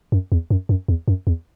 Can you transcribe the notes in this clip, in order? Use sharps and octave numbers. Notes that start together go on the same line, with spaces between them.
F#2
E2
F#2
F#2
E2
F#2
E2